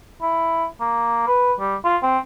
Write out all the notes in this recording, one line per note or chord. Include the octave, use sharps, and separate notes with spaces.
E4
A#3
B4
G3
F4
C4